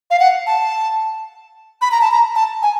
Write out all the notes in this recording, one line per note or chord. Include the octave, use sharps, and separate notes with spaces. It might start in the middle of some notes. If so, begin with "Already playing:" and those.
F5
F#5
A5
B5
A#5
A5
A#5
A5
G#5